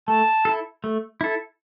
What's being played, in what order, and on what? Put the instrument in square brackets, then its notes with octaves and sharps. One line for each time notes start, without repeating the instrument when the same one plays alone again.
[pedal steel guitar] A3 [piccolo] A5
[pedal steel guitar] E4 A4
A3
E4 A4